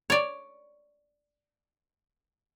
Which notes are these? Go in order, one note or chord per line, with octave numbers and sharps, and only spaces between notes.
C#5 D5